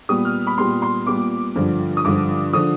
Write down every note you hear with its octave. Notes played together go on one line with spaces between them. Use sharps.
A#2 G3 B3 D#6
F6
B5
A#2 G3 B3 C6
C6
A#2 G3 B3 D6
G2 D3 F3
D#6
G2 D3 F3 D6
D3 F3 D#6